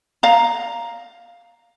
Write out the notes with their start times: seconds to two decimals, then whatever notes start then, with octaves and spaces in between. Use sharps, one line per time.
0.23 F5 A#5